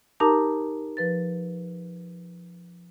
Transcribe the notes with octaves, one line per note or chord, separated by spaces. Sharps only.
D#4 G4 A#4 A5 A#5 D6
F3 B4 A6